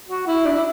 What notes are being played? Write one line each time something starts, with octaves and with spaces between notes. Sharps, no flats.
F#4
E4
D4
E4